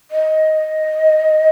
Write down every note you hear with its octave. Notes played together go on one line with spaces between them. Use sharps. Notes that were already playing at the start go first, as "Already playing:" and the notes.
D#5